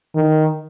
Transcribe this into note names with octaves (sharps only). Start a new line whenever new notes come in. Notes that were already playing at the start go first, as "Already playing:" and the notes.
D#3